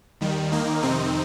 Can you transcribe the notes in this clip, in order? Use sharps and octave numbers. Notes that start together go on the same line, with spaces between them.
D#2 D#3 G3
D#2 D#3 A#3 D#4
F2 C3 D#3 C4 D#4